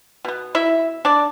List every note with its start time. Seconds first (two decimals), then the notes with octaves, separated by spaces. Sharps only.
0.25 B2 B3
0.55 E4 E5
1.05 D4 D5